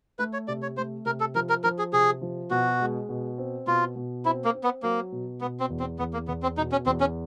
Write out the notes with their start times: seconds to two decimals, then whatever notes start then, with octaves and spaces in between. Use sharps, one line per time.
0.19 A3 B4
0.33 C#5
0.48 C3 D5
0.62 C#5
0.77 A3 C5
1.06 C3 A#4
1.20 A4
1.35 F3 A#4
1.49 A#4
1.64 F3 A#4
1.79 G#4
1.93 C3 G#4
2.22 F3
2.51 B2 F#4
2.80 G#3
3.09 B2
3.38 C4
3.67 B2 F4
3.96 B2
4.25 C4 E4
4.45 A#3
4.54 C4
4.64 B3
4.83 F#3 A#3
5.12 B2
5.41 B2 B3
5.60 C4
5.70 E2
5.80 C4
5.99 E2 B3
6.13 A#3
6.28 E2 B3
6.43 C4
6.57 B2 D#4
6.72 C#4
6.86 E2 C4
7.00 C#4